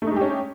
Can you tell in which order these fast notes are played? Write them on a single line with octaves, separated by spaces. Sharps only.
A3 D#4 G#3 G4 C#4